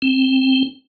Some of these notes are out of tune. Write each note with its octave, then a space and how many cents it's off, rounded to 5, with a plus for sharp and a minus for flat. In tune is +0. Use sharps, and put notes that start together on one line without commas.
C4 +10